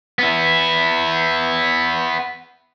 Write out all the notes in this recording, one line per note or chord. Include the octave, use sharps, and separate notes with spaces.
B3 E4